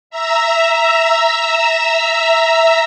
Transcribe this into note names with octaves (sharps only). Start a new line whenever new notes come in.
E5 A#5 E6